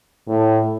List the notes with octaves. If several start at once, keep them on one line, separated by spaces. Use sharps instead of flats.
A2